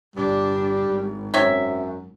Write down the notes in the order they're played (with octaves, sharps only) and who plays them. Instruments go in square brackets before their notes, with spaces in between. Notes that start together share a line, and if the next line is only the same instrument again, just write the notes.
[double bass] G1 D4 [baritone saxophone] G3
[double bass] G#1
[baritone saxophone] F#2 [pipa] C4 C#5 E5